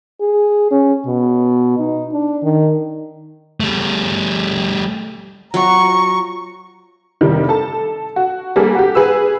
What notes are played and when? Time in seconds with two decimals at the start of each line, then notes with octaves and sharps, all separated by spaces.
0.21 G#4
0.71 C#4
1.06 B2
1.79 D#4
2.12 D4
2.43 D#3
3.60 G3 A3
5.54 F#3 F4 F#4 A#5 C#6
7.21 F1 D#3 G3
7.49 A4 A5
8.16 F#4
8.56 G3 A#3 G#4 A4
8.75 F#4 G4
8.95 G#4 B4 E6